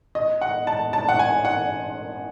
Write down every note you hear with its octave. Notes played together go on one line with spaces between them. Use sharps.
D#5
F#5
A5
A5
F#5
G#5
F#5